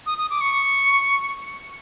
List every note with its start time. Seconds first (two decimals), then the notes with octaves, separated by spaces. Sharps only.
0.06 D#6
0.18 D#6
0.30 D6
0.41 C#6